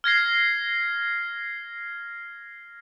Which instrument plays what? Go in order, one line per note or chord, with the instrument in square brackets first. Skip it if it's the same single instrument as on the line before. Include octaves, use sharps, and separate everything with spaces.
[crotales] F6 G#6 A#6 C7